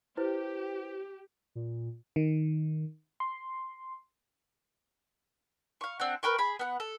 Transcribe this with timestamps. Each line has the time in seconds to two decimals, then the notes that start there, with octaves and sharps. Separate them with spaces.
0.17 E4 G4 B4 C5
1.55 A#2
2.16 D#3
3.20 C6
5.81 F5 C#6
6.00 C4 D4 F#5
6.23 A#4 B4 G5 C#6
6.38 G#4 B5
6.59 B3 F#5
6.80 A4